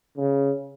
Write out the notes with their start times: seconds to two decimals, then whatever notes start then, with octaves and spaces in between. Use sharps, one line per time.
0.17 C#3